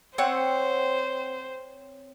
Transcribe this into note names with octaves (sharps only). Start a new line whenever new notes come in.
C4 C5 C#5 F#5